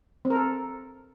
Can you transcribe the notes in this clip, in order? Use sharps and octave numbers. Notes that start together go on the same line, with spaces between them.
C4
A#4
A4